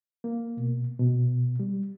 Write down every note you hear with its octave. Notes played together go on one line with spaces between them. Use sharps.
A#3
B2
B2
G3